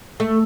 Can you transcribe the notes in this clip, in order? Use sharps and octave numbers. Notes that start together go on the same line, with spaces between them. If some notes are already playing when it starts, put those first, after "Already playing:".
A3